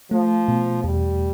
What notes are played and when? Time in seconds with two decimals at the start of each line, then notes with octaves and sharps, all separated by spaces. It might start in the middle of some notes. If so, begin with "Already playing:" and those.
0.11 F3 A3
0.48 B2
0.84 E2 G3